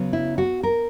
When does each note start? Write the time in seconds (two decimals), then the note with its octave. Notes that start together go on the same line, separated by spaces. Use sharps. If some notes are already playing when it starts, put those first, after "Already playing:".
Already playing: C#3 F#3 B3
0.13 E4
0.38 F#4
0.63 A#4